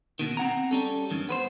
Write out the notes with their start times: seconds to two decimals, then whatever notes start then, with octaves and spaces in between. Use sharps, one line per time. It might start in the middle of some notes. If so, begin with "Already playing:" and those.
0.19 D#2 B2 D#3
0.37 C4 F#5 A#5
0.71 G3 C#4 A4
1.10 E2 G2 D#3
1.29 B3 B4 C5